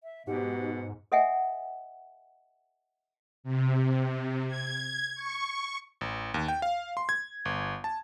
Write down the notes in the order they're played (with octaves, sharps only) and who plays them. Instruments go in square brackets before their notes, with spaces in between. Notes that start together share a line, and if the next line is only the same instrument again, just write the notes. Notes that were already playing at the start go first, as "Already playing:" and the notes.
[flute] E5
[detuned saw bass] G#2 [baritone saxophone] B2 [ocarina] G4 [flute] F#5
[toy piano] A4 D#5 E5 F#5 G#5
[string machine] C3
G#6
C#6
[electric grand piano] A1
D#2
G5
F5
C6
G#6
G1
A5